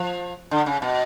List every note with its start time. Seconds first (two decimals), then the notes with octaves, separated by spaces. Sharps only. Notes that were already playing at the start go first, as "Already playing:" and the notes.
Already playing: F3
0.51 D3
0.66 C#3
0.82 B2